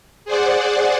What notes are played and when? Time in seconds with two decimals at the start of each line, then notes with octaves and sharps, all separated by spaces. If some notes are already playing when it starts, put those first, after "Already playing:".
0.25 G#4 C5 D5 F#5